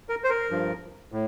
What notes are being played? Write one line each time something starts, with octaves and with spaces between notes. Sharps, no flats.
A#4
C5
A#4
G2 F3
A2